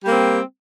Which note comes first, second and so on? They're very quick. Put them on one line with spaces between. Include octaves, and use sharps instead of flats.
G3 A#3 C4